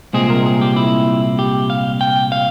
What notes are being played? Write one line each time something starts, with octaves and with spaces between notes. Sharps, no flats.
C2 A#2 G#3 C4 G#4
A#4
G#4
G4
E4
G4
F5
G5
F5